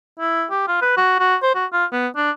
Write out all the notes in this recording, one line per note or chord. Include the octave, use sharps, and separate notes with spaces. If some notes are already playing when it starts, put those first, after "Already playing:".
E4
G4
F4
B4
F#4
F#4
C5
F#4
F4
B3
D4